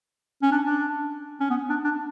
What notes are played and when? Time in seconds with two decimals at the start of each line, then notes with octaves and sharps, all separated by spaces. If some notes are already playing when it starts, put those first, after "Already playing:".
0.42 C#4
0.52 D4
0.66 D4
1.40 C#4
1.50 B3
1.69 D4
1.84 D4